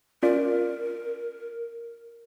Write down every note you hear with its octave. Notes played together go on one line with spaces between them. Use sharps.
C#4 F4 A#4 D5